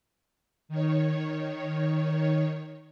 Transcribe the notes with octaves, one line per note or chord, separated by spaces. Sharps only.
D#3 C#5